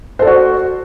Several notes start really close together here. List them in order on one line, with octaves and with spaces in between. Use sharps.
C5 A4 D5 F#4